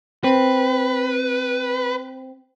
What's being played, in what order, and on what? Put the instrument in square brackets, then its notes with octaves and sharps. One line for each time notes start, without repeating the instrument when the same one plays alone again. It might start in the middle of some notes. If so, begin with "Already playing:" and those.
[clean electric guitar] C4 [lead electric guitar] B4